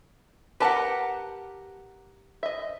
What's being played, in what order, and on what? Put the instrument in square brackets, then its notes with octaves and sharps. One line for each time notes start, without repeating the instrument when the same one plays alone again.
[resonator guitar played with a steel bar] G4 A#4 F#5 [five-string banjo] B4 A5
[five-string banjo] D#5 E5